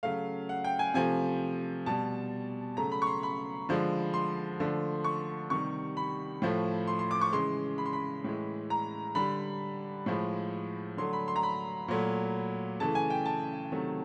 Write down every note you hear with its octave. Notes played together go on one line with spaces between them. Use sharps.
C#3 F#3 A3 F5
F#5
G5
G#5
C3 F3 A3 G#5
B2 G3 A5
C#3 F#3 A3 A#5
B5
C#6
C6
B5
D3 F3 G#3
C6
D3 F3 A3
C#6
C3 D#3 G3 C#6
B5
A2 F3 A3
C6
C6
D6
C#6
C#3 E3 G#3 C6
B5
C6
B5
A2 E3 G#3
A#5
D3 G3 B5
A2 F3 G#3
D3 F#3 A3 C6
B5
C6
A#5
B5
A#2 F#3 A3
C#3 E3 A3 A5
G#5
G5
A5
C3 D#3 F#3 A3